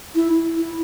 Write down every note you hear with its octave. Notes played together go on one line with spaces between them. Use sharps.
E4
E4